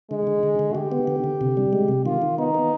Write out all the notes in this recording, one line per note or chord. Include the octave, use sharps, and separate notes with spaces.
D3 G#3
D3
D3
D3
D3 G4
B3
D3
D3
C3
G3
G#3
C3
D#3 F4
D#3
B3 D#4
B3